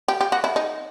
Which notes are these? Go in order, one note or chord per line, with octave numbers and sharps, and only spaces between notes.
G4
G4
F#4
E4
D#4